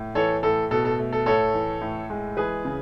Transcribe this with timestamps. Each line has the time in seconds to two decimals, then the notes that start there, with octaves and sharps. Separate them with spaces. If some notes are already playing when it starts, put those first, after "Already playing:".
Already playing: A2
0.15 E3 A4 C#5
0.43 A2 A4
0.71 B2 A4
0.85 A4
0.99 A3
1.13 A4
1.26 A2 A4 C#5
1.54 E3
1.81 A2
2.10 G#3
2.37 E3 G#4 B4
2.65 C#3